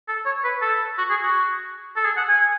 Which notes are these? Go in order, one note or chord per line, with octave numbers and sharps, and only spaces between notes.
A4
C#5
B4
A4
F#4
G#4
F#4
A4
G#4
F#5
G#5